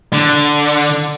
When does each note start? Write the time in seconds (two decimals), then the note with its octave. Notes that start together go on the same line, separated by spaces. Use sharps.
0.13 D3